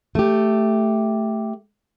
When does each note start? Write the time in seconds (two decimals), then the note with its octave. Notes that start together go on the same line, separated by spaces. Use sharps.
0.15 A3 G4